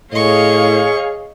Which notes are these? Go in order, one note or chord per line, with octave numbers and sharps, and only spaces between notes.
A2 G#4 C#5 D#5 F5 C#6